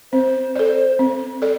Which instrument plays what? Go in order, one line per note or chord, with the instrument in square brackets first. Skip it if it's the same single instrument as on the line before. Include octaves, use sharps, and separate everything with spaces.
[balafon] C4 [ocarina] C5
[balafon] A4 D5
C4
A4 D5